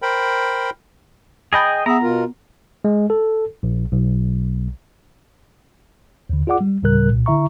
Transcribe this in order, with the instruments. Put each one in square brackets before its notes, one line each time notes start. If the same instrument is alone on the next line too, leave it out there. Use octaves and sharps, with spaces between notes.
[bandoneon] A#4 C5 G5 B5
[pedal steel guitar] G#4 D#5 G5 [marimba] A5 B5 A6
[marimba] B3 F#5 [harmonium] G#4 E5 [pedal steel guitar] A#5
[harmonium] B2 F4 A#4
[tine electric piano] G#3
A4
A#1
B1
D#2 D3
F4 G#4 D5 F#5 D6
G3
D2 A2 C#3 G3 A#4 F#6
C2 A#2
D3 E4 E5 A#5 C#6